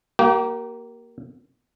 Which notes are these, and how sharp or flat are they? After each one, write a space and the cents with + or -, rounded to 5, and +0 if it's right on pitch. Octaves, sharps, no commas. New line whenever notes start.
A#3 +5 G4 -35